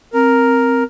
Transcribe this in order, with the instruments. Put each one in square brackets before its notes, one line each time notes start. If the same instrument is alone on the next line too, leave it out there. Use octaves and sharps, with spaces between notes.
[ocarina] C4 [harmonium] A#4